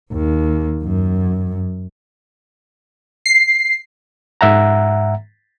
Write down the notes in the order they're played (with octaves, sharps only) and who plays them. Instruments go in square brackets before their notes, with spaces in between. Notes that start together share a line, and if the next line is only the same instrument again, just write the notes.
[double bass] D#2
F#2
[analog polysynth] C7
[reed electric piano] G#2 E5 F#5 A#5